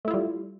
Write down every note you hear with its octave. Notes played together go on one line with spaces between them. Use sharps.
G3 A3 E4 F4